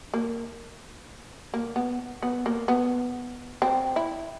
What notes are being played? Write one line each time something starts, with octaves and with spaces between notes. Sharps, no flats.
A#3
A#3
B3
B3
A#3
B3
C4
E4